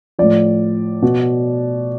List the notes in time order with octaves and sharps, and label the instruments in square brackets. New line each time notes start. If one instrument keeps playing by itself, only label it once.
[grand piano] A2 F3 D5
B2